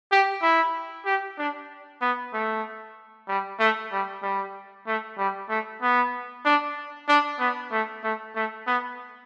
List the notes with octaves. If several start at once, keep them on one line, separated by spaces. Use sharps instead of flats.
G4
E4
G4
D4
B3
A3
G3
A3
G3
G3
A3
G3
A3
B3
D4
D4
B3
A3
A3
A3
B3